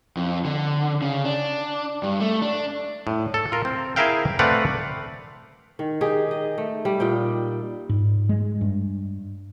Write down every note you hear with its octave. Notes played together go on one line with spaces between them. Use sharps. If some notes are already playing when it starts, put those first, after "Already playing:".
F2
D3
C#3
D4
G2
A3
D4
A2
A4
F4 A#4
C4
E4 G#4 A#4 E5 F5 G5
A3 C4 B4 D5 F5 F#5
D#3
D#4 G4 G#4
D#5
A3
G3
A#2 D#4 G5
G#2
G#3
G2